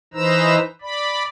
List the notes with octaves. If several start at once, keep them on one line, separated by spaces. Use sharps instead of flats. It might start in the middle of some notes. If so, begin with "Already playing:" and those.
E3 D#4 B4 C5 A#5 E6
D5 B5